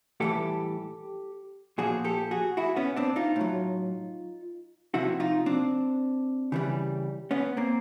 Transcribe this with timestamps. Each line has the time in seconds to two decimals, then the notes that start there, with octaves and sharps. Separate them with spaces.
0.20 A2 E3 G3 G4 A4
1.78 A#2 F3 F#4 G#4
2.04 G4 A4
2.31 F#4 G#4
2.57 E4 F#4
2.76 B3 C#4
2.96 C4 D4
3.16 D#4 F4
3.36 A2 F#3
4.94 C3 F3 E4 F#4
5.20 D#4 F4
5.46 C4 D4
6.52 C#3 E3 G3
7.31 B3 C#4
7.57 A#3 C4